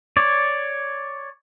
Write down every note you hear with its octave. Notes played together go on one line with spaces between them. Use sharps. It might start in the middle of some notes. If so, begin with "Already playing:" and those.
C#5 D5